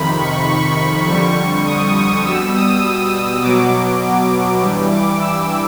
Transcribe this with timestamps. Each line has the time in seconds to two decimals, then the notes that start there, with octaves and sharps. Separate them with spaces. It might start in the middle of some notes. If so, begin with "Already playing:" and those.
Already playing: F2 C3 D#3 B5
0.20 C#6
0.48 C#6
1.07 F2 D3 G3 C#6
1.65 D#6
1.95 D#6
2.24 B2 G3 E6
2.55 D#6
3.42 B2 F#3 D6
4.61 G2 E3 G3
4.90 D6
5.19 E6